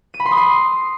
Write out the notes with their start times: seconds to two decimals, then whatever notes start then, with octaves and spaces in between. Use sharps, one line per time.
0.14 D#7
0.20 B5
0.26 C6
0.31 D#6
0.37 C7